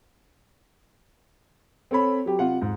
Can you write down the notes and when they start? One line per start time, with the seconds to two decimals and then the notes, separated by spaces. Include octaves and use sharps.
1.91 C4 A4 C#5 B5
2.26 F#3 G4
2.39 C3 F4 F#5
2.62 G#2